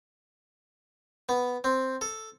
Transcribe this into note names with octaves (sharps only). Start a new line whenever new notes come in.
B3
C4
A4